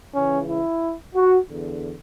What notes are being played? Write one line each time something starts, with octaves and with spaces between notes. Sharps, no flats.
C#2 C#3 E3 C#4
E4
F#4
E2 D3